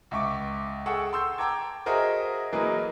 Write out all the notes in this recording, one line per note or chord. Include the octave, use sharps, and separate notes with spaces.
C#2 E5 C#6 D6
G#4 A4 F#5 G5 C#6 E6
C6 E6 G6
G5 A5 A#5 D6 G#6
F#4 G#4 A#4 C5 D#5 E5
E3 F#3 A#3 G#4 B4 D#5